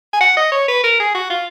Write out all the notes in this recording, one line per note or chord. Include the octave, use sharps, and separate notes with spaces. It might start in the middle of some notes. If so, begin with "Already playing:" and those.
G#5
F#5
D#5
C#5
B4
A#4
G#4
F#4
F4